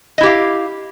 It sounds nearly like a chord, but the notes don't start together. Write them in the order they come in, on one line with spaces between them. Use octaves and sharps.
D#5 E4 G4 F5